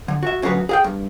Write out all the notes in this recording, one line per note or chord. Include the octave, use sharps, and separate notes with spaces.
D3
F#4 E5
D2 C#3 F#3 F#4 B4
G#4 F5 G5
G2